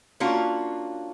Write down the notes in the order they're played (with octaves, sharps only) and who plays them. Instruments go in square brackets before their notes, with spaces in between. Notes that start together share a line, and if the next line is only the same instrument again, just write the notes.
[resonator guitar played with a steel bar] A#3 C#4 D4 F4 F#4